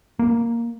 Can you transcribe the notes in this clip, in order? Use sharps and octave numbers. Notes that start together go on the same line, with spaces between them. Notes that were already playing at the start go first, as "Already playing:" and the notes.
A#3